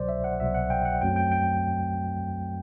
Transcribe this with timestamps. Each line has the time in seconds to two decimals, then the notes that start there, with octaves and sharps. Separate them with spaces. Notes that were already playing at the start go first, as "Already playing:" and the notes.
Already playing: C2 B2 F#3 C5 D5
0.08 E5
0.24 F#5
0.39 C2 B2 F#3 E5
0.54 F#5
0.70 G5
0.85 F#5
1.01 F#2 F#3 A3 C4 G5
1.16 G5
1.32 G5